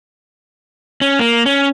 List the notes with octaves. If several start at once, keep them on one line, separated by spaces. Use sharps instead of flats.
C#4
A#3
C#4